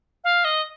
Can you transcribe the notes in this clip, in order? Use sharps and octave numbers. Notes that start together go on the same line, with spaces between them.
F5
D#5